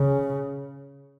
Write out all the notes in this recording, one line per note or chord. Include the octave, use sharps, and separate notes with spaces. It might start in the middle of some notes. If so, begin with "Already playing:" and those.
Already playing: C#3